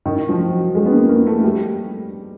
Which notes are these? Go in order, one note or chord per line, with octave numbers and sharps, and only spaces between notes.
D#3
F3
F#3
G#3
B3
A#3
A#3
A3
G3